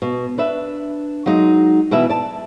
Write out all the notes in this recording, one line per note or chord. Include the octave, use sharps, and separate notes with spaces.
B2
D4 B4 E5
F#3 G#3 D#4
B2 E3 B4 E5
D5 A5